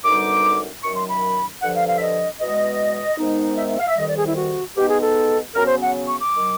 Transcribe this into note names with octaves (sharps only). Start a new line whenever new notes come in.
F#2 D3 G3 B3 D#4 D6
F#2 D#3 F#3 C#6
C6
B5
G2 D3 F3 F#5
F5
F5
E5
D#5
E2 B2 G#3 D#5
G#2 D#3 G#3 B3 D#4
E5
E5
F5
E5
F2 C3 D#3 G3 D#5
D5
G#4
E4
F#4
B2 G#3 B3 D#4 G4
G#4
A4
C#3 F#3 B3 A#4
C5
F#5
C#6
D6
D#3 F#3